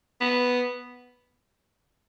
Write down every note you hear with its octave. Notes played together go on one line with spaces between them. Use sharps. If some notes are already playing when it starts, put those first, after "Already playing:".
B3